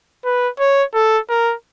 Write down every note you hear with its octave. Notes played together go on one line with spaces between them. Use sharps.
B4
C#5
A4
A#4